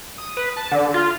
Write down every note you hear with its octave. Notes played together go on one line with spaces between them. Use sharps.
D#6
B4
A5
D3
F4